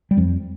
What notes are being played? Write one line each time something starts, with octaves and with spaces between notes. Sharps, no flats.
G3
F2 F3